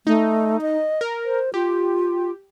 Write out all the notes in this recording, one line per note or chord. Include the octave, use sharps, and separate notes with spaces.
A3 D#4
D#5
A#4
C5
F4 G4